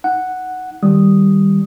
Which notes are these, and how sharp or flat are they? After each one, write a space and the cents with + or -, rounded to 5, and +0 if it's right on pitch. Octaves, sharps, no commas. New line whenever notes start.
D#4 +15 F#5 +0
D#3 -10 G3 +0 D#6 +0